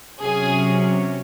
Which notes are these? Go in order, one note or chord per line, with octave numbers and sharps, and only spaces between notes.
C3 F#3 C#4 G#4